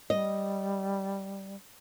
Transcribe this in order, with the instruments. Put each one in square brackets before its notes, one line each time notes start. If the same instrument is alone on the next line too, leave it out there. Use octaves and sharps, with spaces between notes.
[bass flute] G3 [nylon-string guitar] D#5